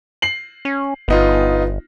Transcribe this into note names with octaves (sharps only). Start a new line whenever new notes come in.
C7 F#7
C#4
G1 B3 D#4 F4